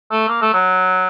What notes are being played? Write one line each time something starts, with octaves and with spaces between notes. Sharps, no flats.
A3
A#3
A3
F#3